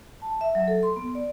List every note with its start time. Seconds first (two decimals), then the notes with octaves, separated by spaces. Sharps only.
0.22 A5
0.41 E5
0.55 F#3
0.68 A4
0.83 C6
0.96 B3
1.15 D5